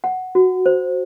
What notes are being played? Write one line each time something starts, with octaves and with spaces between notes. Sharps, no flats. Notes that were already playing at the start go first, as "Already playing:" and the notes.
F#5
F#4
C5